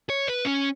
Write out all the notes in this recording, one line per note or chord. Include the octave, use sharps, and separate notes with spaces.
C#5
B4
C#4